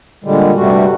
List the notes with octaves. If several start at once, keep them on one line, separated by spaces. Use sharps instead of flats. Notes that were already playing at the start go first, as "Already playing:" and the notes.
A#2 D3 G3 G#3
G2 C3 G3 A3 F#4